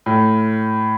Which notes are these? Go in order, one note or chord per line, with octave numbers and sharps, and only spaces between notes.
A2